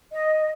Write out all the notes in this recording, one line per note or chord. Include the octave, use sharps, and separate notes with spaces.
D#5